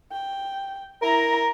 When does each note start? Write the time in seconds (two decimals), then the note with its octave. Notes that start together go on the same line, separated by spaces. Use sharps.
0.12 G5
1.02 E4 A#4 A#5